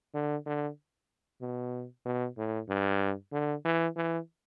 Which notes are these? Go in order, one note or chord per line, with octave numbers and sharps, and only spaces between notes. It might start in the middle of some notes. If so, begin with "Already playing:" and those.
D3
D3
B2
B2
A2
G2
D3
E3
E3